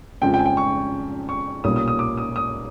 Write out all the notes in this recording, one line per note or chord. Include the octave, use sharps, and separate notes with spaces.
F2 C#3 F3 G#3 C4 G5
G5
G#5
G5
C#6
C#6
B1 A#2 G3 A#3 C#4 D#6
D#6
D#6
D6
D#6
D#6